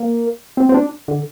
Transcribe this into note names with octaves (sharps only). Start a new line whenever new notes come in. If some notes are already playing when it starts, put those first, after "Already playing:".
Already playing: A#3
C4
C4
D4
D3